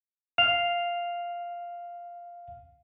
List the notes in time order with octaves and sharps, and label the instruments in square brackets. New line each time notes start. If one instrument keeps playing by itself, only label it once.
[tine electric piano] F5 [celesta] F7